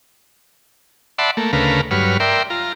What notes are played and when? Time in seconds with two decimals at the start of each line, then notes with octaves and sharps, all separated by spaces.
1.18 D5 E5 F#5 A5 B5 C6
1.37 A3 A#3
1.53 D2 C#3 A3 A#4 B4 F5
1.91 G2 F#3 B4 C#5 F6
2.20 A#4 D5 E5 G5 C6
2.50 F4 A#5